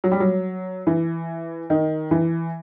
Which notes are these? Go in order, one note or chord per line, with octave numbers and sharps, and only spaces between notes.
F#3
G3
F#3
E3
D#3
E3